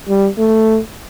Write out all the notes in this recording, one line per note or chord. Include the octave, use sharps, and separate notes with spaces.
G3
A3